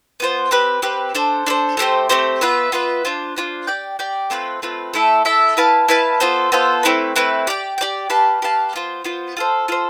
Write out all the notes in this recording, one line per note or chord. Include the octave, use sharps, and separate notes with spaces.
B3 F4 C5
C4 G4 B4
C4 G4 B4
D4 A4 C5
D4 A4 C5
A3 C4 G4 C5
A3 C4 G4 C5
B3 F4 B4 E5
B3 F4 B4 E5
D4 F4 C5
D4 F4 C5
G4 D5 G5
G4 D5 G5
A3 C4 F4 B4
A3 C4 F4 B4
A3 E4 A4 E5
A3 E4 A4 E5
E4 B4 F5 A5
E4 B4 F5 A5
B3 F4 A4 C5
B3 F4 A4 C5
A3 C4 E4 B4
A3 C4 E4 B4
G4 D5 G5
G4 D5 G5
G4 B4 F5 A5
G4 B4 F5 A5
B3 F4 C5
B3 F4 C5
F4 A4 C5
F4 A4 C5